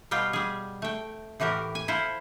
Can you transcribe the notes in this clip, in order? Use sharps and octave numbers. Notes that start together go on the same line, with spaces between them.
B2 G3 F4 G5
G3 G#4
A3 G5
A2 E3 F#4 G4 A#4
G#5
E4 F4 A4 C5